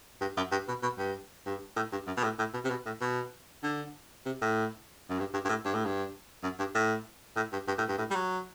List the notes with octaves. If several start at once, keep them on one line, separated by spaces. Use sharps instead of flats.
G2
F#2
G2
B2
B2
G2
G2
A2
G2
F#2
B2
A2
A2
B2
C3
B2
A2
B2
D3
C3
A2
F#2
G2
G2
G2
A2
G2
A2
G2
F#2
G2
A2
A2
G2
G2
A2
G2
A2
G3
F#3